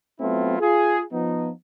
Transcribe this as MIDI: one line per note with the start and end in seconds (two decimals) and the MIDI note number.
0.20 0.58 54
0.20 0.58 57
0.20 0.58 59
0.20 0.58 60
0.20 0.58 64
0.20 0.58 65
0.59 1.01 65
0.59 1.01 68
1.12 1.50 53
1.12 1.50 59
1.12 1.50 63